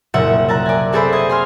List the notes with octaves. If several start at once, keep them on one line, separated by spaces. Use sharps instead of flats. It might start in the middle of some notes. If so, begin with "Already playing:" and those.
F#1 C2 A#2 E5 F#5 C#7
E5 A5 A#5 F#6
D5 G#5
C4 G#4 A4 C5 E5 B5
D#5 G#6
G#5 C6 F6